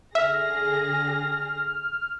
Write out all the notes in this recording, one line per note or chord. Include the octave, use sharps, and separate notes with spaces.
D3 G#4 E5 F6 A#6